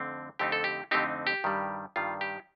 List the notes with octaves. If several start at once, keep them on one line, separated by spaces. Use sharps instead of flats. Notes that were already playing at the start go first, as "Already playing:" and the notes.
Already playing: F2 D3 A3 C4 D#4
F2 D3 A3 C4 D#4 G4
A4
G4
F2 D3 A3 C4 D#4 G4
G4
G2 D#3 G3
G2 D#3 G3 F4
G4